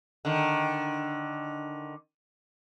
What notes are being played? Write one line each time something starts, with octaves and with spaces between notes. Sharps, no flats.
D3 D#3